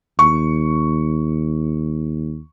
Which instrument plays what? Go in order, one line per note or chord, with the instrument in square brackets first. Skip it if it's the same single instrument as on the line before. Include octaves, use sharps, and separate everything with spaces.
[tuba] D#2 [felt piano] C#6